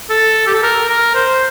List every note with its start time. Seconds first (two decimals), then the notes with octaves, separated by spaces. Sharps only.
0.10 A4
0.47 G4
0.54 A4
0.63 A#4
0.89 A#4
1.15 C5